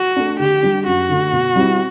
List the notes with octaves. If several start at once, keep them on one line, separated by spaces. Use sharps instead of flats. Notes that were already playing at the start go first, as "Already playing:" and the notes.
Already playing: F#4
A3 D4
D3 G4
G3 D4
F#2 F#4
D3 A3
B2
G3 C4 E4